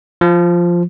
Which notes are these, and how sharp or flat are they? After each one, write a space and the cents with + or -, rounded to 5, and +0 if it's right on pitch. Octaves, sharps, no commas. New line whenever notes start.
F3 -5